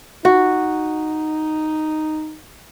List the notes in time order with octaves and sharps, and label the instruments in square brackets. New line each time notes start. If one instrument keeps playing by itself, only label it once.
[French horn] D#4 [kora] F#4